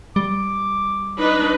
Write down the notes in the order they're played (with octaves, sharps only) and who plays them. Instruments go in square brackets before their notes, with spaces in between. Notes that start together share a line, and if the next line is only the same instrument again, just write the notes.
[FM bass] G3 [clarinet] D6
[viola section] D4 D#4 B4